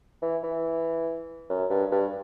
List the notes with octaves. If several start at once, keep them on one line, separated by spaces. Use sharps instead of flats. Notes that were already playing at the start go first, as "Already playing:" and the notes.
E3
E3
F#2
G2
G2